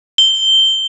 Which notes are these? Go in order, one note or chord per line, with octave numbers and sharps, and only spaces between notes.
G7